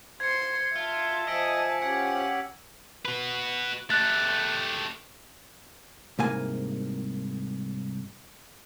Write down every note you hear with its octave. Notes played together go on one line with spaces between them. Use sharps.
C5 C6 G#6 C#7
F4 E5 A5
F3 D#5 G#5 E6 B6 D7
C#4 G4 F#5
F#4 B4
A3 G4 F#6 A6
C2 G#2 A#3 G#5